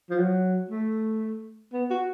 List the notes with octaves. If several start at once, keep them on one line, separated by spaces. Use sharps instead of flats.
F3
F#3
A3
B3
F#4